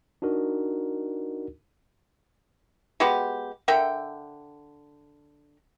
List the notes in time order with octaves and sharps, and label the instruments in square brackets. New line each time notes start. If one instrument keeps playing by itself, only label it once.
[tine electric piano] D4 D#4 F#4 A#4
[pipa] G#3 B3 F#4 G4
D3 A#4 E5 G5